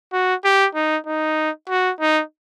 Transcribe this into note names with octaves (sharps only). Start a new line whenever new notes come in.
F#4
G4
D#4
D#4
F#4
D#4